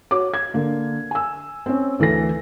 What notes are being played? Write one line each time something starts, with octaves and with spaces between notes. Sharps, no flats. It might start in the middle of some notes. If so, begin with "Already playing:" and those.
F#4 C#5 D6
G#6
D3 A#3
G#5 E6
C4 C#4
D2 E3 A4 A#6